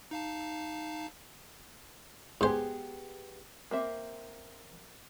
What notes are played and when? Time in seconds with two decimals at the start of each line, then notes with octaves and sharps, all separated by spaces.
0.11 D#4 F5 A5
2.41 G#2 B3 G4 G#4 C5
3.71 A#3 C4 E5